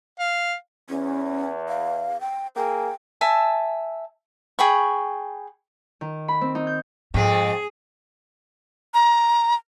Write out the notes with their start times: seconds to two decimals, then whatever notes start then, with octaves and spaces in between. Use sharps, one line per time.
0.19 F5
0.89 E2 C#4
1.69 F5
2.21 G5
2.56 A#3 G#4 G5
3.21 E5 G#5 A5
4.59 G#4 G5 B5 C#6
6.01 D#3
6.28 B5
6.41 C4
6.55 D#4
6.67 G6
7.14 F2 G#2 C4 G#4
8.94 A#5